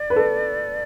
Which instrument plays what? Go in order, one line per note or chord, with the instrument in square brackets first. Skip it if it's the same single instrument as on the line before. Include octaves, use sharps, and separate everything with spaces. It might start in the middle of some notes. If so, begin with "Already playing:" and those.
Already playing: [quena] D5
[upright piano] B4
A4